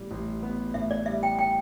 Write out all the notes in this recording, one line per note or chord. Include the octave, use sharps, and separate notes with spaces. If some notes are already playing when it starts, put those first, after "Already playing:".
Already playing: A1 A2 G3 B3
A1
B3
A2 E5
D5
G3 E5
G5
G5